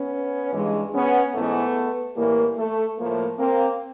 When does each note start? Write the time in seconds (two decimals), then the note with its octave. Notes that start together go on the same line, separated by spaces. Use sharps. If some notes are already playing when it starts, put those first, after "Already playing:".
Already playing: B3 C#4
0.53 G2 E3 G#3
0.93 B3 C#4
1.34 G#2 E3 G#3 A3 B3
2.16 A2 E3 G3 A#3
2.56 A3
2.97 A2 F3 A3 A#3
3.38 A#3 C4